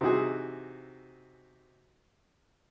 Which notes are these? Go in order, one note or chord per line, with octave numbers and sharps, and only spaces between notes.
C3 E3 D#4 F#4 G#4